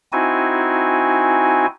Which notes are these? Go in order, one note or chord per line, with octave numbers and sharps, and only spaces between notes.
C4 D#4 E4 F#4 G#5